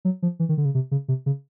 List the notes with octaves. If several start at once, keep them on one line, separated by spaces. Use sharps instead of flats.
F#3
F3
E3
D#3
D3
C#3
C3
C#3
C3
C#3